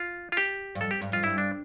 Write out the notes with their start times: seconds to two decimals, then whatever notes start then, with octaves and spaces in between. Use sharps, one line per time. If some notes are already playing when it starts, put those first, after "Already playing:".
Already playing: F4
0.32 F4
0.37 G4
0.75 G2
0.81 F2 A4
0.91 G4
1.02 G2
1.12 F2 F4
1.23 G2 E4
1.38 D4